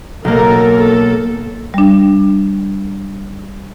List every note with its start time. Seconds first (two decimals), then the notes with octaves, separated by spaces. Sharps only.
0.25 B1 A#3 A4 A#4
0.78 A4
1.74 G3 D4